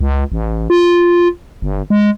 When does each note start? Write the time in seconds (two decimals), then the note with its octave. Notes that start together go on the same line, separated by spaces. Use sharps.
0.01 C#2
0.32 A1
0.70 F4
1.62 G1
1.90 G#3